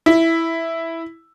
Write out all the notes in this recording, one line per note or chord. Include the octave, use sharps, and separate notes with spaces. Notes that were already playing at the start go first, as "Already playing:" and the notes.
E4